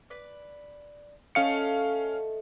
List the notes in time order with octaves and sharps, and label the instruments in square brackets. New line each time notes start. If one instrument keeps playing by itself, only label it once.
[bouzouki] B4 D5
[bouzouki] A3 A4 D#5 [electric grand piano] C#4 F5 C#7